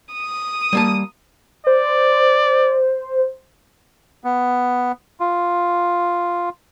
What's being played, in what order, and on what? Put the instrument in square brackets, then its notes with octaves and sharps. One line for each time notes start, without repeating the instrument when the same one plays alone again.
[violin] D#6
[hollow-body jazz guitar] G3 A#3 A5
[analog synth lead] C5 [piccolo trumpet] D5
[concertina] B3
F4